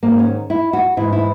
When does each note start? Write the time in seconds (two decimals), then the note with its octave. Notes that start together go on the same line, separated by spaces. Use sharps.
0.03 G#2 D#3 A#3
0.19 C#4
0.50 E4
0.73 F#4
0.97 G#2 E3 E4
1.12 E4